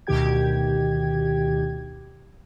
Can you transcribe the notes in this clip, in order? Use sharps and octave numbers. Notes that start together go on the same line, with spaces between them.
D2 B2 D#3 G4 G5 G#6